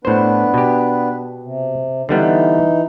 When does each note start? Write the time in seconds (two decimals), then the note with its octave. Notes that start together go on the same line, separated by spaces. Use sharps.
0.05 A2 B3 D4 B4 C5
0.54 B2 G4
1.43 C3
2.09 D3 E3 G3 B3 D#4